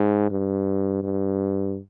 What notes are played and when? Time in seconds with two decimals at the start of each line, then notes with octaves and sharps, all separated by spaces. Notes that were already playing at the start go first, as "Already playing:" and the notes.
Already playing: G#2
0.31 G2
1.03 G2